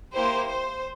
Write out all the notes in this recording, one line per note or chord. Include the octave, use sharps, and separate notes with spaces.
A#3 E4 G4 C5
C5